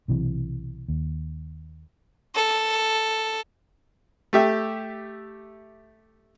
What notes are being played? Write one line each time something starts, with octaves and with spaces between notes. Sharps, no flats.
B1 C3 E3
D#2
A4
A3 G4 E5